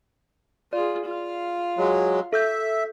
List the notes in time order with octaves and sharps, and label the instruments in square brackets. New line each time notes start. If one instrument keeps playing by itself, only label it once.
[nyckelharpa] F4 G#4 [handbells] D5
[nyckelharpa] F4 F5
[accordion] F#3 G#3
[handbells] A4 E6 G6 [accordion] E5